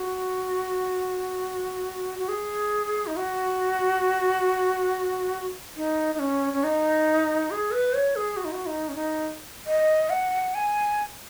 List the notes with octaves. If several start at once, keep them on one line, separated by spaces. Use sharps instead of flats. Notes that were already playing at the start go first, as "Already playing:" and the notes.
Already playing: F#4
F#4
G#4
D#4
F#4
D#4
D#4
C#4
C#4
D#4
G#4
B4
C#5
G#4
F#4
D#4
F#4
D#4
C#4
D#4
D#5
F#5
G#5